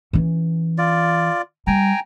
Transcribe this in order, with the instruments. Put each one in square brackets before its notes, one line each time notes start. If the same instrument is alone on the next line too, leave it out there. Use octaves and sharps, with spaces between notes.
[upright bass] E3 C#4
[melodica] F4 D5
[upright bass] G3 [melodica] G5 G#5 A#5